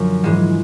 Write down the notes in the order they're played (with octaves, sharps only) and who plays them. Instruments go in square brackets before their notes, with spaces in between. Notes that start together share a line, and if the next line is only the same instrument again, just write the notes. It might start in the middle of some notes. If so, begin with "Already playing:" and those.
Already playing: [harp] F#2 D3 F3
G#2 E3 G#3